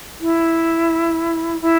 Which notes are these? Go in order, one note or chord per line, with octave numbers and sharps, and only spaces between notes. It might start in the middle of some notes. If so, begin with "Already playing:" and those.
E4
E4